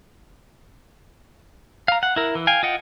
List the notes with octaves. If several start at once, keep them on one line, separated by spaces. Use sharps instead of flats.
F5 A#5
F#5
E4 A#4
E3
F5 G5 G#5
F4 D#5 F#5 G5